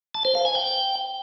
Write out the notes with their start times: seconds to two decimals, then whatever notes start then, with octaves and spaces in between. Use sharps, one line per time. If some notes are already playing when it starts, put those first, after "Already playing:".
0.15 A5
0.25 C5
0.35 F5
0.45 G#5
0.55 G5